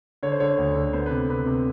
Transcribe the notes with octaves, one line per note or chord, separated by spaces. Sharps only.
D3 C#5
C5
D3 C#5
D2
D3
B3 C5
C3 B4
C3 B4
C3